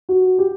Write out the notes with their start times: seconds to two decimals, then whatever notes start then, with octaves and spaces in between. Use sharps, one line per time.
0.09 F#4
0.39 G4